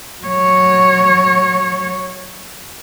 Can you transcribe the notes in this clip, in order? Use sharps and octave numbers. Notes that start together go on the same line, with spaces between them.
F#3 C#5